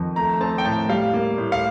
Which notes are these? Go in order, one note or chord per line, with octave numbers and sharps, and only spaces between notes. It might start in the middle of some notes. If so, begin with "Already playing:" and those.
Already playing: F2 D#3
A3 A#5
C4 A5
G5
A2 A5
G3 F5
A#3
A2
F5